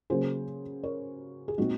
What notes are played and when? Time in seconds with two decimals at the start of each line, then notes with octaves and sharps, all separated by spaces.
0.10 C#3 F#3 A#3 G#4 C5
0.83 A#4 C#5
1.48 G#4
1.58 A#2 G#3 C4 D#4 F#4